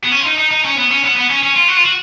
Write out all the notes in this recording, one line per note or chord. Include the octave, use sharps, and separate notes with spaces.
B3
C#4
F4
D#4
D#4
D#4
C#4
B3
C#4
B3
B3
C#4
C#4
F4
F#4
F4
F#4